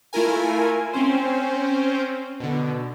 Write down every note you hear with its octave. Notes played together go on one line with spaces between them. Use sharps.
A3 E4 F4 A#4 G#5
C4 C#4 C5
B2 D3